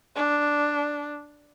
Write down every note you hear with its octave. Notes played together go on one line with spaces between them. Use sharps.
D4